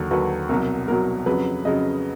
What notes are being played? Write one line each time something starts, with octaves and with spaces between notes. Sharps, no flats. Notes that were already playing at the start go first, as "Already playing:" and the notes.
Already playing: D#2 D3 F#3
D#2 D3 F#3 B4
C2 B2 F#3 A#4
C2 B2 F#3 A#4
F2 C#3 F#3 B4
F2 C#3 F#3 D#5